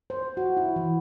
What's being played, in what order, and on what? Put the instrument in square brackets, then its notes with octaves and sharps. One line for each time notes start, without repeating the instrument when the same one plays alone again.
[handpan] C5
F#4
E4
E3